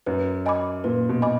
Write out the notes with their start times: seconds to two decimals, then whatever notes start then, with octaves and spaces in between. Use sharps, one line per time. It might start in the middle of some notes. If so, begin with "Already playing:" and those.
0.06 F#2 B4
0.46 D#5 G#5 B5 D6
0.84 A#2 B4
1.09 B2
1.22 D#5 G#5 B5 D6